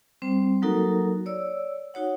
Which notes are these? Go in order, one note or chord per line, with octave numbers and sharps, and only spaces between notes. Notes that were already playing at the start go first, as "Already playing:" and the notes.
G3 C4 C5
F#3 A#3 D#4 F#4 A4 A#4
C#5 D5 E6
D#4 F#4 C#5 F#5